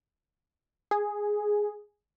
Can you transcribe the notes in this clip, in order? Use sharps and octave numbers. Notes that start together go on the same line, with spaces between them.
G#4